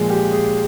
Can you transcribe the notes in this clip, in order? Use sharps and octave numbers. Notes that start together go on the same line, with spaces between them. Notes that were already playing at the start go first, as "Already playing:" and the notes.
Already playing: A#2 F3 G#3
G4
G#4